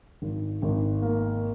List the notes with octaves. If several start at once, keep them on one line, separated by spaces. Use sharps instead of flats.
G#1
G#1
A#3